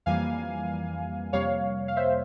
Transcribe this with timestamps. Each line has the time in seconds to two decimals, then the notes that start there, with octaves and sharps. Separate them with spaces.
0.06 F2 E3 G3 A#3 F5 G#5
1.33 F2 C3 G3 A#3 C#5 F5
1.88 F5
1.97 C5 E5